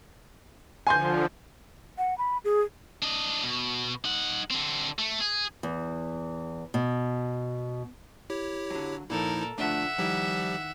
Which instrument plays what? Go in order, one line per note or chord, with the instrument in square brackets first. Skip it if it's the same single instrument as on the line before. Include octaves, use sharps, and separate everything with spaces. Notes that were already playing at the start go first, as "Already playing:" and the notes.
[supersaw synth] D3 F3 [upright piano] G#5 C6 G6
[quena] F#5
B5
G#4
[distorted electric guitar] D4 D#5
B2
D#4 F#5
D3 C4
A3
G#4
[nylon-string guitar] E2
B2
[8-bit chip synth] E4 G4 C#5
[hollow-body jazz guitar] D3 F#3
[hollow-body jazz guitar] A#2 [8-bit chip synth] F3 D#4 E4 [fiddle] A4 A#4
[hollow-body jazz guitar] D3 F3 D4 [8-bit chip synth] A3 [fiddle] E5 F#5
[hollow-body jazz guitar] D#3 E4 [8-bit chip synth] F3 G3 G4